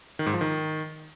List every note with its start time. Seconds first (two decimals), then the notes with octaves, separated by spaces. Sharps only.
0.19 D#3
0.26 G#2
0.34 F3
0.41 D#3